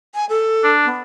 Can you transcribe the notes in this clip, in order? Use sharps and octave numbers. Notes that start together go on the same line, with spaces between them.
G#5
A4
D4
B3